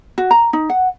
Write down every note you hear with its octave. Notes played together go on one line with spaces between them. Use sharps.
F#4
A#5
D#4
F#5